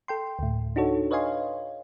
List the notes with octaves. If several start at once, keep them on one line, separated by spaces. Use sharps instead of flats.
A4 G5 C6
D2 A2
D4 D#4 F#4 A4 C#5
B4 C#5 D#5 F5 G#5 C6